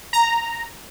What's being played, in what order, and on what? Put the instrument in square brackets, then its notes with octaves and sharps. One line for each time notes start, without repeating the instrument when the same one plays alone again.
[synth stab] A#5